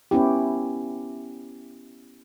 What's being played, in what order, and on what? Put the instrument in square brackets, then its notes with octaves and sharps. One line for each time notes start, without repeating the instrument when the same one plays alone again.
[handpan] B3 C#4 E4 G4